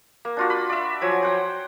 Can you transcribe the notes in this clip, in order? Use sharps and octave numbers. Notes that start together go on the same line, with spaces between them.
A#3
D4 F4 F#4
B5
D5 E5
F3 F#3 G#5
C5 F#5 G5